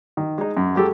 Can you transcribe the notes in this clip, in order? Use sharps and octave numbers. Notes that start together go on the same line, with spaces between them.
D#3
G#3 D#4
F#2
F#3 G#3 G4 A4